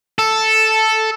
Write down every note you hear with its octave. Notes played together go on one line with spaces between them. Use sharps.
A4